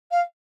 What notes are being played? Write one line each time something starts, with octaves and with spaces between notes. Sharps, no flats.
F5